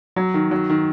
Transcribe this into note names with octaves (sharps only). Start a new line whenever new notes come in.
F#3
D#3
F#3
D#3